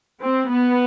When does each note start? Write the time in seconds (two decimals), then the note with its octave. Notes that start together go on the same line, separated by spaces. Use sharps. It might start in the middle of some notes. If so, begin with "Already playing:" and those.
0.22 C4
0.51 B3